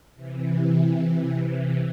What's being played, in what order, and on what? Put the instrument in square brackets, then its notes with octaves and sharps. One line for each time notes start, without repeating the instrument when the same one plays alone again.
[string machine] C3 E3